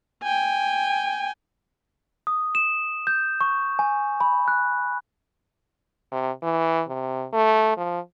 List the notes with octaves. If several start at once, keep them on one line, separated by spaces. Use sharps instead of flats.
G5 G#5
D#6
E7
G6
C#6
G#5
B5
F#6
C3
E3
C3
A3
F3